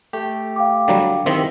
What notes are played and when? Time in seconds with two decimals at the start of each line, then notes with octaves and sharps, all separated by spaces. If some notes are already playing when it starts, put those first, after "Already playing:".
0.13 A3 G4
0.56 F5 G5 D6
0.88 D3 F#3 G3
1.26 D#3 E3 C4 G4 D#5 E5